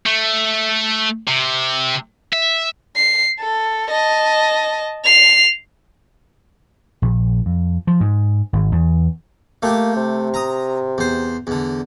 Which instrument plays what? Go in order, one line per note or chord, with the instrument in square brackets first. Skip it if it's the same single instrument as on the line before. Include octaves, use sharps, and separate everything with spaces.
[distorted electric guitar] A3
C3
E5
[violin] C7
A4
D#5 A5
C7 F7
[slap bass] A#1
F2
F3
G#2
G#1
E2
[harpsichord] A3 G4 G5 [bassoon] A#3
[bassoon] C3
[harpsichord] A#5 D#6
E2 C5
E2 D3